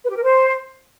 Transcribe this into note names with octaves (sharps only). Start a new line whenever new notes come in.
B4
G4
A#4
C5